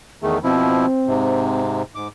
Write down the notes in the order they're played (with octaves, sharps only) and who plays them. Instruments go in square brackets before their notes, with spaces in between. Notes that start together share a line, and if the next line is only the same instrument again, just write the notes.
[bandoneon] E2 D#3 A3 [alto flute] G#4
[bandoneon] B2 F3 E4 [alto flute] C4
[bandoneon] G#2 C3
G#2 D6